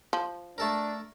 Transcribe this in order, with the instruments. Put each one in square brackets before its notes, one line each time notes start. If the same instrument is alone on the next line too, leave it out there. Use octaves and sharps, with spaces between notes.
[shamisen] F3
[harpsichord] A3 A4 A#4 [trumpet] D4